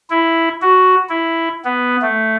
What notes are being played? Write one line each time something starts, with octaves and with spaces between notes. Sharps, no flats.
E4
F#4
E4
B3
A3